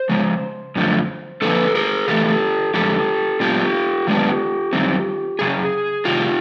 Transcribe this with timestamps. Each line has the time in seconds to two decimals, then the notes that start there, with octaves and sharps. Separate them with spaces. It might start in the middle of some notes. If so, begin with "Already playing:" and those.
Already playing: C5
0.09 C#3 F3 G#3
0.76 F#2 D3 F3 A3
1.42 D3 F3 A#3 A4 B4
1.75 G#4 A#4
2.07 C#3 E3 A3 G4 A4
2.74 F2 D3 F3 G#3 G4 A4
3.40 A#2 F#3 B3 D4 F4 G4
4.07 F#2 D#3 G#3 B3 D4
4.73 F#2 D#3 G3 C4
5.39 F#2 C#3 G#4
6.05 C3 D#3 F4 G4